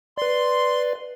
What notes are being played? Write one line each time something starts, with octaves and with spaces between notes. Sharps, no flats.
B4 D5 C6